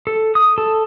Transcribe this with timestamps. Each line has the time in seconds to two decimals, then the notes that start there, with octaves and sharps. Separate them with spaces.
0.07 A4
0.35 D#6
0.58 A4